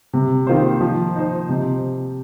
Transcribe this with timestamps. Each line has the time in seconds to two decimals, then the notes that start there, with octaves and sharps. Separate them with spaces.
0.13 C3
0.47 D#3 A#3 F4 C5
0.81 F3
1.16 D#4 C5
1.49 C3